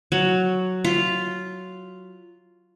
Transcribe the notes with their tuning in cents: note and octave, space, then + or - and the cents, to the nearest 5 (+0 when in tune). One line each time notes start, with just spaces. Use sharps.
F#3 +0
F4 -5